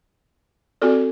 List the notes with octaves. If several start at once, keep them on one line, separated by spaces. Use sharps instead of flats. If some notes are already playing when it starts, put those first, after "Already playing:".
C4 F#4 A4 D5